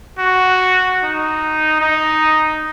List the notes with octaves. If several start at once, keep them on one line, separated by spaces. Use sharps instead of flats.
F#4
D#4
D#4